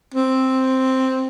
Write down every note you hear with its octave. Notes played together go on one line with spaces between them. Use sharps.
C4